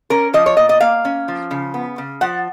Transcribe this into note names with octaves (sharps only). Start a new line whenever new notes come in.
C#4 A#4
F3 D#5
C#5
A#2 D#5
D#5
A#3 F5
C#4
F3
C#3
B3
C#3
F3 F#5